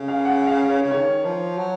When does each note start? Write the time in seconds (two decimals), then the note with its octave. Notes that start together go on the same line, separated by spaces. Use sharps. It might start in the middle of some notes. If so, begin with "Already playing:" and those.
Already playing: C#3
0.08 F5
0.25 F#5
0.47 F5
0.69 C#5
0.82 C#3
0.91 D#3 C#5
1.24 F3
1.57 F#3